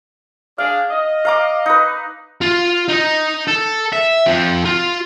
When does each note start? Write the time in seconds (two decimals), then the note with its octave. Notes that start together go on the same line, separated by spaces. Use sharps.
0.58 D4 G#4 F5
0.90 D#5
1.25 F5 A#5 D6
1.66 D#4 B4
2.41 F4
2.89 D#4 D#5
3.48 A4
3.93 E5
4.26 F3 C4
4.65 F4